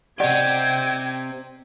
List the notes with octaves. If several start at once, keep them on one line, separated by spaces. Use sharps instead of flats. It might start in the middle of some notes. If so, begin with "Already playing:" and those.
C4 G4 D5 D#5 F#5 G5 G#6